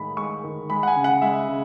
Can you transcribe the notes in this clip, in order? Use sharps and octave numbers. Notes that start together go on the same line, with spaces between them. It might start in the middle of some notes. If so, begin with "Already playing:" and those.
Already playing: A2 D#3 G#3 B5
G#3 C#6
D#3
G#3 B5
F#5
G#5
C#3
F#5
G#3 E5
C#3